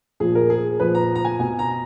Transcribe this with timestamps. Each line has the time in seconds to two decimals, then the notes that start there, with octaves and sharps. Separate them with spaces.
0.20 A#2 F3 G#4
0.35 A#4
0.50 G#4
0.80 A#2 F3 B4
0.95 A#5
1.15 A#5
1.25 G#5
1.39 B2 G#5
1.59 A#5